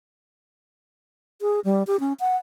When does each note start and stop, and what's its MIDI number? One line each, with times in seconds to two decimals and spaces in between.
1.42 1.60 68
1.65 1.83 55
1.87 2.00 67
2.00 2.13 61
2.20 2.36 78